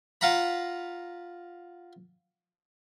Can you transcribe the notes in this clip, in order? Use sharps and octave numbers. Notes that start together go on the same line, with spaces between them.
F4 F5 F#5 A#5 B5